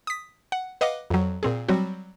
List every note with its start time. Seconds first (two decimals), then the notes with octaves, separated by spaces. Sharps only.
0.07 D#6 B6
0.52 F#5
0.81 B4 D#5 F5 F#5 D6
1.10 F2 F#3
1.43 A#2 C4 G#4
1.69 F#3 G3 C4 F#4